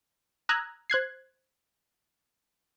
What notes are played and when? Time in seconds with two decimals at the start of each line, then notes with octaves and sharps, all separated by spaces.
0.49 A#5 D#6 E6 F#6 G#6 A#6
0.90 C5 F#6 G#6 C7